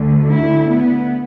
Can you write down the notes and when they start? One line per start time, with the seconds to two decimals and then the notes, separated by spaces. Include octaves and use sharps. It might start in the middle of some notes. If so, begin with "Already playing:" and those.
Already playing: D2 D3
0.27 E4
0.67 B3